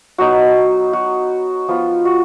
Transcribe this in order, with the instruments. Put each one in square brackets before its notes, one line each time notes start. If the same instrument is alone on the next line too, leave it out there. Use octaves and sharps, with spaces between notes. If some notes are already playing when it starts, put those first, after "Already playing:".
[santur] F#3 B3 D#4 F#4
F#4
F3 B3 F4
F#4